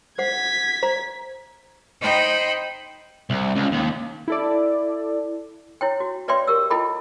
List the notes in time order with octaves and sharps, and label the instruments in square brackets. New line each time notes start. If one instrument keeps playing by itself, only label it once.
[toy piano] C5 F#5 [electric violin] G#6 B6
[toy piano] C5 A#5
[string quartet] D#4 C5 G5 B5
[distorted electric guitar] C2
C#2
D#2
[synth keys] E4 A4 D5
[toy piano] E4 C#5 G5
F#4
B4 C#5 D5 E5 G5 C6
G4 A#4 E6
E4 F4 A4 D#5 G5 B5